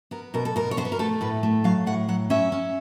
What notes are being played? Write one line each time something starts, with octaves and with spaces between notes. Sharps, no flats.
B3 A#4
B2 A#4
A4
B2 A#4
C#5
B3 C5
B4
A#4
A3 A4
A2 B4
A3
F#3 F5
A2 F#5
F#3 F#5
C#4 E5
C#4